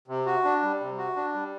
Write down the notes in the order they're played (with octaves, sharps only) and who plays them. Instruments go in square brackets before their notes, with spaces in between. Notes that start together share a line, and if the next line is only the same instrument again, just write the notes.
[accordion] C3
F#4
D4
G3
C3
F#4
D4
G3